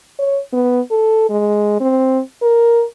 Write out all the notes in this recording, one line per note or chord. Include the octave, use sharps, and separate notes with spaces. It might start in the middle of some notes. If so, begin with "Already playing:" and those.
C#5
B3
A4
G#3
C4
A#4